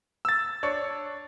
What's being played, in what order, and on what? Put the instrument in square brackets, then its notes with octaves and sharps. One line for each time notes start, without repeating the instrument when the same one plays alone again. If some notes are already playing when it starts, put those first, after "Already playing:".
[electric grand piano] E6 A6
[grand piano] D4 C#5 C#6